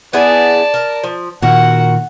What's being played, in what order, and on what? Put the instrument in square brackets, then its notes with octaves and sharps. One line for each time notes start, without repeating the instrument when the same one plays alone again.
[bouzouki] B3 E4 G#4 [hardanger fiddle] D5 A5
[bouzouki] A#4
F3
[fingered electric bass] A#2 D#3 [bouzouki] F#4 A#4 [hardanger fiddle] F#5